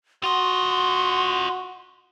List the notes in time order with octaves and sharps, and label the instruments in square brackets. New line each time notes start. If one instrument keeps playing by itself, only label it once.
[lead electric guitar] F4 D#5 [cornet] F#4 [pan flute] C6